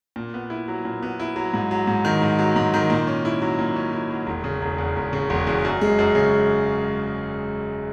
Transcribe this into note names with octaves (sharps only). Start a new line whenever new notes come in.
A#2
B3
E4
F#3
A#2
B3
E4
F#3
G#2
F#3
G#2
D#3
G#2
F#3
G#2
D#3
A#2
C#4
E4
F#3
A#2
C#4
E4
F#3
E1
C#3
E1
E2
E1
C#3
E1
E2
F#2
G#3
F#2
C#3